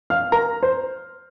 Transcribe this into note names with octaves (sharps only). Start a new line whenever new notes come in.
F5 F6
A#4 A#5
C5